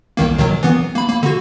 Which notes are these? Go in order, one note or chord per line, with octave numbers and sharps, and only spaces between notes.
C2 D#3 A#3
B2 D#3 F#3
E3 B3
A#3 B5
A#3
D3 F#4